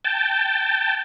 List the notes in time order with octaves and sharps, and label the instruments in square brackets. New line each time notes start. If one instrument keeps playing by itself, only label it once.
[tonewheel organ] G5 A5